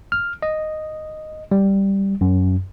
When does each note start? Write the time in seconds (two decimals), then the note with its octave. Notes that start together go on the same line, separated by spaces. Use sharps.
0.12 F6
0.43 D#5
1.51 G3
2.21 F#2